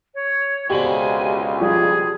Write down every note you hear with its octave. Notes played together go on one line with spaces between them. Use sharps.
C#5
C#2 B2 D3 C4 G4 G#5 F#7
F3 G3 G4 G#4